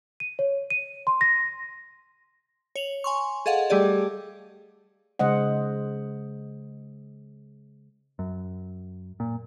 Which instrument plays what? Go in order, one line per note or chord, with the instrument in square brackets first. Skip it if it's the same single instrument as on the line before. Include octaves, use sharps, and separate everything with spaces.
[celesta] D#7
C#5
D#7
C6
A#6
[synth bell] C#5 F7 F#7
G#5 C6 C#6
G#4 A4 D#5 F5 F#5
G3 A3 G4 G#4 D5
[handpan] C#3 G#3 C5 D#5 F#5
[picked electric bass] F#2
A#2